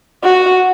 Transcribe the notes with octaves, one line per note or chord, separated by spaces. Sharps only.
F#4